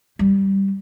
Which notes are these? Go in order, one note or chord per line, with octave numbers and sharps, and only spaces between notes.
G3